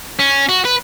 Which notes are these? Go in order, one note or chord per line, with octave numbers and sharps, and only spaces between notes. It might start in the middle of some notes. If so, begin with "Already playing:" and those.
C#4
F#4
B4